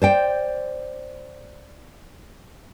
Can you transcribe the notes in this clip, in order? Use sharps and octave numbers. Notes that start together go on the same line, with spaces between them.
C5 D5 G5